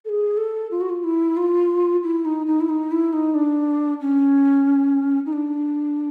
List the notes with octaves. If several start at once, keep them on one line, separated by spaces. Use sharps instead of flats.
A4
G#4
A4
F4
F#4
F4
E4
F4
E4
D#4
D#4
E4
D#4
E4
D#4
D4
C#4
D#4
D4